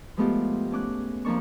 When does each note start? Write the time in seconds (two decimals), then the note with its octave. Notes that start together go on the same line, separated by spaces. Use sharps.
0.17 F3 G#3 A3 B3 F4 G4
0.71 A3 C#4 D6 F#6
1.25 F2 F3 A#3 D4 C#6